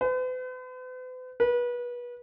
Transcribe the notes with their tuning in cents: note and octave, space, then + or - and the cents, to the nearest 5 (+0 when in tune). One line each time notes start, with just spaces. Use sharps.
B4 +45
B4 -30